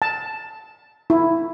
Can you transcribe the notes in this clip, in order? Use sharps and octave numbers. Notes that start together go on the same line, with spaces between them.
A5
E4